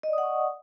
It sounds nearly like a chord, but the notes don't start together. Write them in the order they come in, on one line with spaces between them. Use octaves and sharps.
D#5 D5 D#6 F#5 C#6